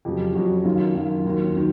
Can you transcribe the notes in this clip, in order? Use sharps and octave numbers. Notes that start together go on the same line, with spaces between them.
F2 C#3 F#3 G4
F2 C#3 F#3 F#4
F#2 D#3 F#3 F4
F#2 D#3 F#3 F4
D#2 D#3 F#3
D#3 F#3